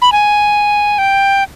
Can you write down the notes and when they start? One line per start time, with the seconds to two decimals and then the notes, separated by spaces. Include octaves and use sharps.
0.02 B5
0.12 G#5
0.98 G5